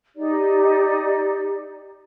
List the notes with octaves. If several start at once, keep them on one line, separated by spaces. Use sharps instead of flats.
D#4 G4 D5